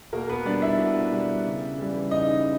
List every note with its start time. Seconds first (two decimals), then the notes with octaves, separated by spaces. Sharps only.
0.13 B2 A#3 A#4
0.29 B3 B4
0.45 G3 D4 D5
0.62 E4 E5
0.79 B2
1.12 G3
1.46 C#3
1.78 E3 G3
2.11 C#3 D#4 D#5